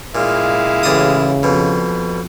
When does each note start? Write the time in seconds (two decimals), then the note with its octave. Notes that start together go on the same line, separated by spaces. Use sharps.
0.15 A#2 G#3 E4 F5
0.83 A1 C#3 D5 D#6
1.43 F2 B2